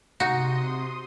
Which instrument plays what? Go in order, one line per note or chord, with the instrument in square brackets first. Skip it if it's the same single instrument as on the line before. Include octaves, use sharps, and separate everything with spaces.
[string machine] C3 C6 D#6 [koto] D#4 F#4